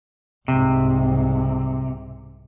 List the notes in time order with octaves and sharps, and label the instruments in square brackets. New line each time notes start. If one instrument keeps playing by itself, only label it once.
[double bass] C2 G#2 [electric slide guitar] C3